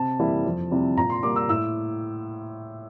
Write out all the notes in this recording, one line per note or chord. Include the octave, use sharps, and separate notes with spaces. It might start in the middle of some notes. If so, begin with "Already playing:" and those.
Already playing: C3 A5
E3 G3 A#3 E4
F2
C3 G3 C4 E4
A#2 A#5
C6
G3 A#3 D6
E6
A2 E6